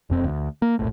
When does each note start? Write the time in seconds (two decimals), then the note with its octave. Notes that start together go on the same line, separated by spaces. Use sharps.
0.10 E1 F2 C4
0.24 D2
0.62 A#3
0.79 F1 A#1 A2